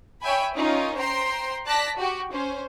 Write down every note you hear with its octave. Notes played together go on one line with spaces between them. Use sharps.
C#5 E5 G5 G#5 B5
C#4 D#4 F4 A#4
C5 G5 A#5 C6
D5 A5 F#6 A#6 B6
F#4 G4
C#4 C5